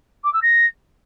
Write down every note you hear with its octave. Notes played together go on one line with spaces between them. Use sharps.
D6
E6
A#6